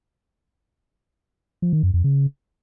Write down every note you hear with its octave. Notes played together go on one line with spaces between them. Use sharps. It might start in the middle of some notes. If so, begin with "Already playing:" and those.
F3
D#3
F#2
F2
C#3